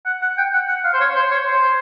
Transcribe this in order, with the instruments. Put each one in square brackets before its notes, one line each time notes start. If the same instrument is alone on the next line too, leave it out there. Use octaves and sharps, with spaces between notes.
[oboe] F#5
F#5
G5
F#5
F#5
F5
C5
C#5
C5
C#5
C5